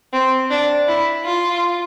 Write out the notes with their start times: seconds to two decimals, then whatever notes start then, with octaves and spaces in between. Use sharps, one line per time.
0.13 C4
0.50 D4
0.88 E4
1.25 F4